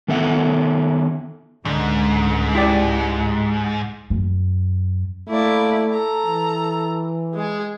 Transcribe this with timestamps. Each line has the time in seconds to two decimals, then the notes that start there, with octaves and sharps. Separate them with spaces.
0.08 D#3 B3 A4 E5 F#5
1.65 C#2 G#2 D3
2.55 E4 G4 D5
4.10 F#2
5.29 A3 A#3 E4 D5
5.93 A4 A#5
6.26 E3
7.34 G#3 G#4